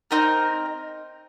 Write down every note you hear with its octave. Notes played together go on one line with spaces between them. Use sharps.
C4 D#4 A#4